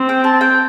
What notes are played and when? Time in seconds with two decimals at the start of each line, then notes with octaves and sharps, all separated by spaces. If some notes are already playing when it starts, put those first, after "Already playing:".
Already playing: C4
0.09 G5
0.24 A5
0.41 G5